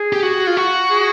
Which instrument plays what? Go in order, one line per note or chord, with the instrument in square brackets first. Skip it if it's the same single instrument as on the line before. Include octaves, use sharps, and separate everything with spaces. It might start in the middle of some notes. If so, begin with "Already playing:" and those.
Already playing: [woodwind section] G#4
[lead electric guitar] G4
F#4
F4
F#4
[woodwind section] G#4